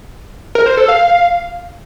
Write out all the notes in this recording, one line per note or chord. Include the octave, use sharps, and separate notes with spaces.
A#4
C5
A4
F5